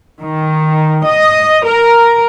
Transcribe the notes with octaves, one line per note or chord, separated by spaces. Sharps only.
D#3
D#5
A#4